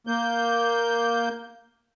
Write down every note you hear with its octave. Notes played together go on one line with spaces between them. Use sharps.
A#3 G6